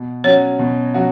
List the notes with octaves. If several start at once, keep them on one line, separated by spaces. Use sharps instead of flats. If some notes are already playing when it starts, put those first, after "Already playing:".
Already playing: B2
F#3 C#4 F#4 C#5
B2
F#3 C#4 F#4